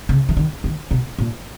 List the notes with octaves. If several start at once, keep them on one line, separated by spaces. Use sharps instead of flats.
C#3
E3
D#3
D#3
B2
A#2